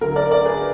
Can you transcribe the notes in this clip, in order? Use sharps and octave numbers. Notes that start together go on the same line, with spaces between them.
D2 D3 F#3 A#4
A#4 D5
A#4 D5
G#4 B4